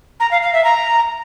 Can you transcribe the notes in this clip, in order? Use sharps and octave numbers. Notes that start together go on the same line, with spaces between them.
A#5
F5
F5
E5
A#5